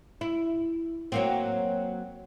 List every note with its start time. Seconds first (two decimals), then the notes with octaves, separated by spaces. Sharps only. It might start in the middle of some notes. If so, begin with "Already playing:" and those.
0.21 E4
1.12 F#3 A#3 C4